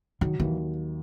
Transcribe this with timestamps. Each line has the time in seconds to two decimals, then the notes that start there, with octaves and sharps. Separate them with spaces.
0.21 D#3 F#3
0.40 D#2 E3